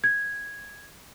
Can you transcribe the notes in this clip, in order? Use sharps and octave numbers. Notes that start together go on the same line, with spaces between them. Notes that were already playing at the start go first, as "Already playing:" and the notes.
G#6